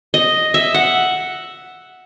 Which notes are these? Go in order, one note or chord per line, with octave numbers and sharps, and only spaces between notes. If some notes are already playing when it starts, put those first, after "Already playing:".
D#5
E5
F#5